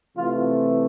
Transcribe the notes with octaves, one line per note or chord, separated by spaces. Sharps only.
C3 E3 A3 F4